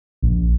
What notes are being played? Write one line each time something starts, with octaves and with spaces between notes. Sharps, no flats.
A#1